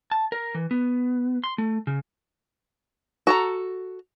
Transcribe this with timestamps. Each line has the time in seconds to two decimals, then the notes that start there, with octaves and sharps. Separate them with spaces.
0.11 A5
0.32 A#4
0.55 E3
0.71 B3
1.44 C6
1.58 A3
1.87 C#3
3.27 F#4 A4 A#5